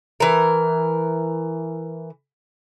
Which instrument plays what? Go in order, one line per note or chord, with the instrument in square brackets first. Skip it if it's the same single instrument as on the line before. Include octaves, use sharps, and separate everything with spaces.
[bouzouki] E3 A#4